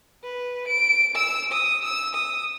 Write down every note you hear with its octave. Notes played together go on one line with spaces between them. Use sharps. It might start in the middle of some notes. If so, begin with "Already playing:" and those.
B4
D7
E6
D#6
E6
D#6